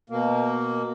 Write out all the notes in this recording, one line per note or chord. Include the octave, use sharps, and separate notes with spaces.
B2 A#3